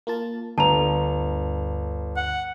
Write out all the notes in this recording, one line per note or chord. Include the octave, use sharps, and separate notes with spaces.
A#3 F4 A5
G1 D2 G2 D3 A5 A#5 F7
F#5